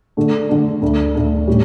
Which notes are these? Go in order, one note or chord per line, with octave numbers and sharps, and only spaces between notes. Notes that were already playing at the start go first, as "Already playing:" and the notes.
D3 A3 D4
D3 A3 D4
D2 D3 A3 D4
D2 D3 A3 D4
A2 G3 C#4 G4